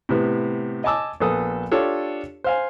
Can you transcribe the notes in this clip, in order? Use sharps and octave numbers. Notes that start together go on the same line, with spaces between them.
A2 C3 B3
D#5 G#5 A5 D6 E6
A#1 B3 A4 D#6
D4 F4 G4 A4 C#5
C5 F5 G#5